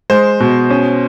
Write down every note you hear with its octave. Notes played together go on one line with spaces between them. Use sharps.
G#3 C5
B2
C#4